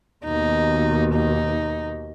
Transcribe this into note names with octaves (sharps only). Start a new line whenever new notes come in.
D#2 B2 D#4
D#4